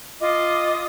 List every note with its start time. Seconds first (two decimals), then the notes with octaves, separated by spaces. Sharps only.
0.20 F4 D#5 D6 D#6